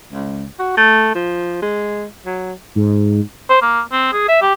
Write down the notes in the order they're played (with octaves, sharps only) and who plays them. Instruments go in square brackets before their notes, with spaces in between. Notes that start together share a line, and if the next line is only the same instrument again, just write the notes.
[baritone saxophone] C#2
F#4
A3
F3
G#3
F#3
[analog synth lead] G#2
[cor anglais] C5
A#3
C4
G#4
E5
G4